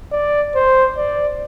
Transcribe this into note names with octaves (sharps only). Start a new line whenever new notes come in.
D5
C5
D5